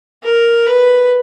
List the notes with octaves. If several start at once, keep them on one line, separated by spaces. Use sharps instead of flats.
A#4
B4